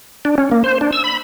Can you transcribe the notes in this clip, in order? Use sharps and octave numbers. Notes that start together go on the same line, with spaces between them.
D4
C#4
A#3
C5
D4
E6
B5